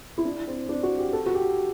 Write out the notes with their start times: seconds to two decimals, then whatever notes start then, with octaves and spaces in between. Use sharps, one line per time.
0.18 E4
0.25 D4
0.48 C4
0.69 D4
0.83 F#4
0.98 G4
1.13 A4
1.26 F#4
1.35 G4